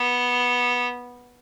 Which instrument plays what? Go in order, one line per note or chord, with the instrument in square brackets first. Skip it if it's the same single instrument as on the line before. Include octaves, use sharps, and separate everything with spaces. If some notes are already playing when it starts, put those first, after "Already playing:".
Already playing: [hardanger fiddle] B3